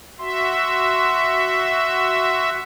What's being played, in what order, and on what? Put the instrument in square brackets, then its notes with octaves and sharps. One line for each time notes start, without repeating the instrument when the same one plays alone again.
[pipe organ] F#4 E5 [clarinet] C6